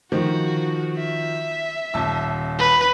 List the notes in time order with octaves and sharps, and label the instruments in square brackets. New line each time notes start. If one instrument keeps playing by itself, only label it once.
[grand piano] D#3 F3 [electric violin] F#4
[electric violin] E5
[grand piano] D#1 A5 E6
[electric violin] B4